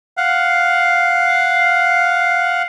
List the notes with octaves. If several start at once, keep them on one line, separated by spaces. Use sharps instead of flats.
F5 F#5